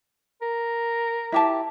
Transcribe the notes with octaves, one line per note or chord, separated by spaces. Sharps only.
A#4
E4 G4 A5